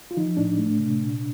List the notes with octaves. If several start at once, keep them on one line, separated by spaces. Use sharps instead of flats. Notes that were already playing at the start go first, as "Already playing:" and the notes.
F4
F3 D#4
A2 D4
A3
C3
A#2